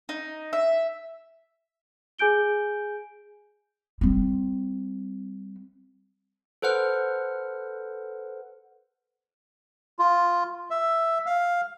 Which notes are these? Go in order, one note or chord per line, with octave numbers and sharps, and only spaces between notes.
D#4
E5
G#4 G#5 G6 D7 G7
G3 C4
A4 B4 C5 F#5 F6
F4
E5
F5